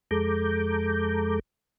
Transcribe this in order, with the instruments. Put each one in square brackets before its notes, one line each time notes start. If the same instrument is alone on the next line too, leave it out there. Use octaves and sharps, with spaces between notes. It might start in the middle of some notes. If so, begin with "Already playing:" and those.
[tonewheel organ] F2 G#3 A4 A#5 D6 G6